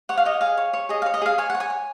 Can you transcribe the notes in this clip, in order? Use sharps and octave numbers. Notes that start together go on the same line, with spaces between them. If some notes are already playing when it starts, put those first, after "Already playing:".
C#5 F#5
F5
C#5 D#5
G#4 F5
C#5
C#5
G#4 D#5
C#5 F5
D#5
G#4 F5
C#5 G#5
C#5 F#5
G#5
C#5